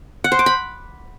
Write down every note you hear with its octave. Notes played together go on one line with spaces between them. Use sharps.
F#5
C5
D6
B5